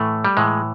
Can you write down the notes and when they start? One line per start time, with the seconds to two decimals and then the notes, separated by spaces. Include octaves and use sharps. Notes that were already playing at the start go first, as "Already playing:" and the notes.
Already playing: A2 E3 A3
0.25 G3
0.37 A2 E3 G#3